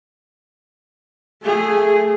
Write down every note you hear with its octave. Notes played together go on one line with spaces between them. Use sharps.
A3 G#4